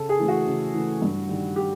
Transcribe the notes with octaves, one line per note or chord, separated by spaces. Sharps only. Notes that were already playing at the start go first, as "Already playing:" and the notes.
Already playing: C#3 A4
G#4
E3 A3
F#4
C#3
E3 A3
G2
D#3 G3
G4